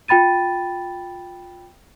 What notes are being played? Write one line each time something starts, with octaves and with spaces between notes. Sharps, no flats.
F4 G5 B5 A6 D#7